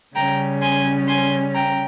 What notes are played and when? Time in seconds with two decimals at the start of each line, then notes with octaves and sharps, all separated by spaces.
0.15 C#3 G3 C#4 G5 A#5
0.61 G#5 C6
1.08 G#5 C6
1.54 G5 A#5